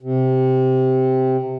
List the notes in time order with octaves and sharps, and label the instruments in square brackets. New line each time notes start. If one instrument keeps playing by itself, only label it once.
[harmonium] C3